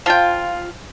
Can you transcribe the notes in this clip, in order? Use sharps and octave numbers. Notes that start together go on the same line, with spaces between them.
F3 F4 G5